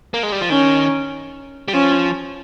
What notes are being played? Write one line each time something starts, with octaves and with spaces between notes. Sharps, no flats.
A#3
G#3
G3
F3
D#3 C#4
G3
F3 C#4